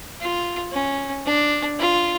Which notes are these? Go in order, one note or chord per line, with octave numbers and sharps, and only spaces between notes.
F4
C#4
D4
F4